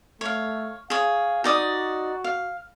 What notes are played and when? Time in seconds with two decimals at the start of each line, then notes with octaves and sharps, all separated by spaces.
0.21 A3 C#5 F5
0.90 G#4 C#5 F5
1.44 D#4 F#4 D5 D#6
2.24 F5